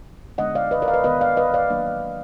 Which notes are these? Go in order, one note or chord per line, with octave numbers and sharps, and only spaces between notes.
D3 G#3 B3 D4 D#5 F#5
D5 F5
B4 D#5
A#4 D5
F5
B4 D#5
D#3 G#3 B3 B4 D#5
D5 F5
B4 D#5
D5 F5
D#3 F#3 A#3 D4